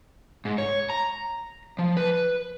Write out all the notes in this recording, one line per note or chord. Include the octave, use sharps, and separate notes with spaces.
G#2
C#5
A#5
F3
B4